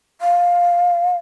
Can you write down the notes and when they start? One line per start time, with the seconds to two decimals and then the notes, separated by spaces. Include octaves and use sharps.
0.21 F5